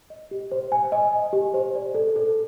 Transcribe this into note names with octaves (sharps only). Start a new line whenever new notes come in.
D#5
G4
C5
G#5
D#5
G#5
G4
C5
D5
A4
A4